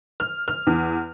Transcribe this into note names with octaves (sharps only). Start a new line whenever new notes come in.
F6
F6
E2